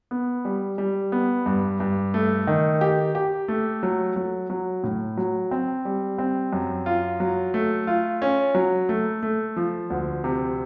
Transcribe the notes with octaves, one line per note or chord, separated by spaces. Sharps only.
B3
G3
G3
B3
G2
G2
A3
D#3
G4
G4
A3
F#3
F#3
F#3
A2
F#3
C4
G3
C4
F#2
F4
F#3
A3
F4
C#4
F#3
A3
A3
F3
D2
C3